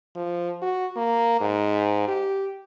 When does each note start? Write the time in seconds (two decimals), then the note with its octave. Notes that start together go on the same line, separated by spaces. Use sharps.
0.16 F3
0.62 F#4
0.96 A#3
1.41 G#2
2.08 G4